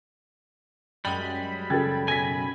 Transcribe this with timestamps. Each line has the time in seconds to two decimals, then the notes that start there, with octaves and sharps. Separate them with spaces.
1.05 F#2 G3 G#3 G5 B5
1.70 C#3 G#4 A4 G5 G#6 A6
2.08 B1 G#5 G#6 A#6 B6